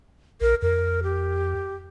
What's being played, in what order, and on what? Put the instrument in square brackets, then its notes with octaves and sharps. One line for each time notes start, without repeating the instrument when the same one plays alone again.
[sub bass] A#1 [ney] A#4
[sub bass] F2 [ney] A#4
[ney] G4